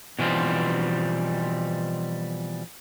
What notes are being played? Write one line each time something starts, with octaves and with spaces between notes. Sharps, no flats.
B2 E3 F3 G3 C4